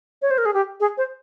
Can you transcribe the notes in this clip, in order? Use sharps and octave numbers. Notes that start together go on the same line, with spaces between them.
C#5
C5
A#4
G#4
G4
G#4
C5